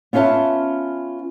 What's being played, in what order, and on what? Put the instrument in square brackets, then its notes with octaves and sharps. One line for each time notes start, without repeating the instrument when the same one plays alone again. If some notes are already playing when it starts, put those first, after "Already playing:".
[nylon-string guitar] B3 C#4 F4 E5 A5